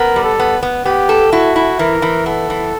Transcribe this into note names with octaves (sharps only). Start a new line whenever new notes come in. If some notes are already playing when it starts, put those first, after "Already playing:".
Already playing: B3 A#4
G3
A4
B3
B3
B3 G4
A4
E4 F#4
E4
E3 A#4
E3
B3 A4
E3